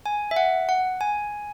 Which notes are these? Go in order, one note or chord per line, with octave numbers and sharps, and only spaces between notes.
G#5
E5
F#5
F#5
G#5